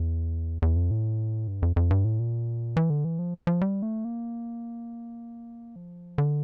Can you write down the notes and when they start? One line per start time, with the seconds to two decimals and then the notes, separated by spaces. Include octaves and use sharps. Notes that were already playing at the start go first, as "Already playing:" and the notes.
Already playing: E2
0.62 E2
0.76 F2
0.91 A2
1.48 G2
1.62 F2
1.76 F2
1.91 G2
2.05 A2
2.19 A#2
2.77 E3
2.90 D3
3.05 E3
3.19 F3
3.47 F3
3.61 G3
3.82 A3
4.05 A#3
5.76 F3
6.18 D3